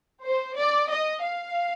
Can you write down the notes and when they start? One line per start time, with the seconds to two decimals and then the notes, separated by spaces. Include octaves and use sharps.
0.24 C5
0.57 D5
0.91 D#5
1.23 F5